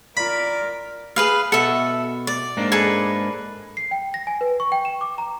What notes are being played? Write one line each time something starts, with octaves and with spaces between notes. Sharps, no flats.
F4 A#4 D5 B5
G#4 B4 F5
B2 A4 E5 F#5
D5
G#2 A#3 D4
G#4 A4 B4
C7
G5
A#6
G#5
B4
C#6
G5
E7
D6
A#5